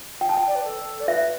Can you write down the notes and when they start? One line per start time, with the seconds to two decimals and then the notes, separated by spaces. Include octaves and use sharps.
0.21 G5
0.29 A5
0.37 G5
0.48 D5
0.55 B4
0.64 A4
1.00 D5
1.07 B4 E5